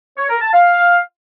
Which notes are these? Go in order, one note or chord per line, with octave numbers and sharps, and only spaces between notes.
C#5
A#4
A5
F5